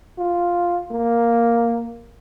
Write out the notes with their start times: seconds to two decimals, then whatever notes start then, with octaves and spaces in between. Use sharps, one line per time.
0.18 F4
0.91 A#3